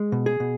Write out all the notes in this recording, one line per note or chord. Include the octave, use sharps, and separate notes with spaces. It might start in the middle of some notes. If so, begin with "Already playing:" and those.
Already playing: G#3
B2
G#4
B2